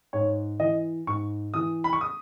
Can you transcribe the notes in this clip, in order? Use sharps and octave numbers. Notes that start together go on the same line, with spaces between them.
G#2 C#5
E3 D#5
G#2 C#6
E3 D#6
B5
C#6
D#6